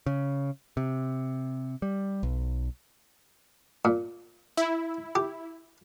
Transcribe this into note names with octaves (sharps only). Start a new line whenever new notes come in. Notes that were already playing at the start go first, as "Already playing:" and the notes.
C#3
C3
G3
B1
A#2
E4
G4